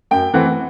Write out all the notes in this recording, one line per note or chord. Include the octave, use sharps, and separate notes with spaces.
F#2 G5
E3 A3 C4 F#5